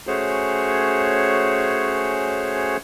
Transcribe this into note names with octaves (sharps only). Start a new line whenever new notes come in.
A3 C#4 F#4 G#4 C5 C#5